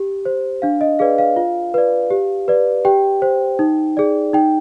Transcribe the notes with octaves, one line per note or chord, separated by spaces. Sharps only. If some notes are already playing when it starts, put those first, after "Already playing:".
Already playing: G4
C5
D4 F5
D#5
G#4 B4 D5 F5
F5
F4
B4 D5
G4
B4 D5
G4 G5
C5
D#4
G#4 D5
D#4 G5